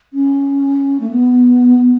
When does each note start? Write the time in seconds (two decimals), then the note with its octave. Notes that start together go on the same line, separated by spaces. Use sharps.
0.13 C#4
1.00 A3
1.11 B3